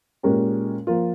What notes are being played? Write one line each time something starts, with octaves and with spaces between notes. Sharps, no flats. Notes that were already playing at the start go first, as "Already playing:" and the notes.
A#2 G#3 C#4 G4 A#4
F3 A#3 F4